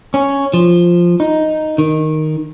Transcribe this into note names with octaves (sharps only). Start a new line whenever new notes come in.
C#4
F3
D#4
D#3